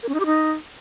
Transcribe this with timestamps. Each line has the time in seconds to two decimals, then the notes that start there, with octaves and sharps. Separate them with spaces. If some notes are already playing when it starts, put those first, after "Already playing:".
0.03 A#4
0.09 C#4
0.14 D#4
0.20 G4
0.26 D#4